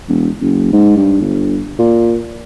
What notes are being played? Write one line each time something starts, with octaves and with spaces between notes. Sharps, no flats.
E1
F#1
G#2
G2
G1
A#2